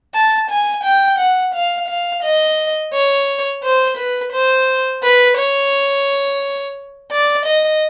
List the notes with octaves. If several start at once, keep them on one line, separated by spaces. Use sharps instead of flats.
A5
G#5
G5
F#5
F5
F5
D#5
C#5
C5
B4
C5
B4
C#5
D5
D#5